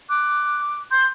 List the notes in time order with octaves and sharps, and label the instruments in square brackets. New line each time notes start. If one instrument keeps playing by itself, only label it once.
[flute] D6 [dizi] F#6
[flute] C6 [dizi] G6